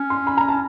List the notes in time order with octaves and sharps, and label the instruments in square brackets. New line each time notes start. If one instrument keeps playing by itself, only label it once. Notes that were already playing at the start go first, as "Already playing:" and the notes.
Already playing: [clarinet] C#4
[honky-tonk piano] C6
B5
A#5
[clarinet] C#4 [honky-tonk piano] A5